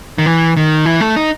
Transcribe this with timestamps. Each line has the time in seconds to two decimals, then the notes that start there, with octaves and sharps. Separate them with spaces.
0.18 D#3
0.26 E3
0.57 D#3
0.86 E3
1.01 A3
1.16 D#4